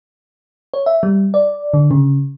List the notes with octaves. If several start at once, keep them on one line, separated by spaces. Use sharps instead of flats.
C#5
E5
G3
D5
D3
C#3